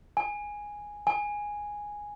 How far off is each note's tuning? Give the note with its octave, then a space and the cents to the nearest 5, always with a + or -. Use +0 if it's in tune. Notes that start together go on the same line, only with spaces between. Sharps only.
G#5 -5
G#5 -5